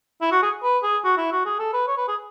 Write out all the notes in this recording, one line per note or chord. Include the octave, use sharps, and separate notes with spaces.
E4
F#4
G#4
B4
G#4
F#4
E4
F#4
G#4
A4
B4
C#5
B4
G#4